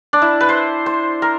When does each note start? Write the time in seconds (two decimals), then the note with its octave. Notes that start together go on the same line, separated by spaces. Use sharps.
0.13 D4
0.22 E4
0.41 B4
0.49 C5
0.86 C5
1.22 A#4